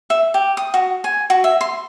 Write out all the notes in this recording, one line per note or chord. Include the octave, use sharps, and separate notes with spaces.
E5
G4
D#6
F#4
G#5
F#4
E5
C6